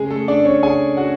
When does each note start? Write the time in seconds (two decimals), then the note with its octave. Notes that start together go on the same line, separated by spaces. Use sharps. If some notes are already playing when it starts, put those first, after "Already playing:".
Already playing: C#3 G#3 G#4
0.10 A3 A4
0.28 G#3 D4 D5
0.45 C#4 C#5
0.62 C#3 G#4 G#5
0.97 G#3 F#4 F#5